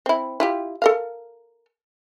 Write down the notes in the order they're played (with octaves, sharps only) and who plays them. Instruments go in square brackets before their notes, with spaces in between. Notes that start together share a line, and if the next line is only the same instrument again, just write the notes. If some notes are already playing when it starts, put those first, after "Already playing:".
[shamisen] C4 E4
E4 F4 G4
A4 A#4 F5